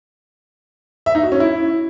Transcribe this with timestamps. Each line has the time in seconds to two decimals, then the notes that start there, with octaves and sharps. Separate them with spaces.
1.06 E5
1.15 D#4
1.23 F#4
1.32 C#4
1.40 E4